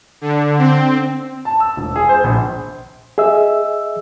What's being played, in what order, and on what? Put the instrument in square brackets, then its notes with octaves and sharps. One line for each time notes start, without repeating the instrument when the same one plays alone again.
[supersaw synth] D3
C4
[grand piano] A5
E6
E1
G#4
C5
A#1
[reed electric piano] G#4 D#5 E5 E6